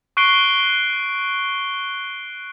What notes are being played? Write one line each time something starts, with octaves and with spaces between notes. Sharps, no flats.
C#6 F#6 C7 D7 G7